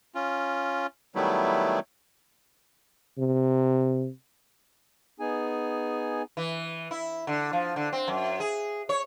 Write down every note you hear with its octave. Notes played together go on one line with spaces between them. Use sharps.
C#4 F4
D#3 F#3 G3 A3 B3 E4
C3
B3 D#4 G#4 G#5
E3
E4
D3
F3
D3
C4
F#2
G#4
C#5